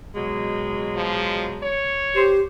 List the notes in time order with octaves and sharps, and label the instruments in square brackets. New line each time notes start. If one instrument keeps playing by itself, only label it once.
[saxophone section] B2 F#3 G#3
[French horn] F3
C#5
[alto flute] G4 [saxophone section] C5